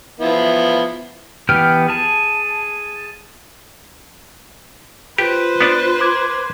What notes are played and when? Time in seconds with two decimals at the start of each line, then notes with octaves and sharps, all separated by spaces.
0.20 F3 B3 E4
1.49 E3 B3 G4 G5 F6
1.88 G#4 A5
5.18 F4 G4 B4 C5
5.61 B3 D4
6.00 C6 D6 G#6